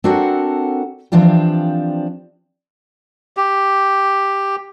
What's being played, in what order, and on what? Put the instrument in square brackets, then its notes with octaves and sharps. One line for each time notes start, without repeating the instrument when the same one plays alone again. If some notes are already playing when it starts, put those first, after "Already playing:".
[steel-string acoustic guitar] C4 D4 F#4 A4 A#4 F#5
E3 F3 C4 D4 F4 G4
[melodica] G4